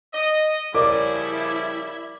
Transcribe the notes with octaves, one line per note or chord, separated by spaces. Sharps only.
D#5
C#3 F3 G3 E4 A#4 D5 D6